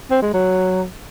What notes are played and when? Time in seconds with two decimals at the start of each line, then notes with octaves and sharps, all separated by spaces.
0.11 C4
0.22 G#3
0.34 F#3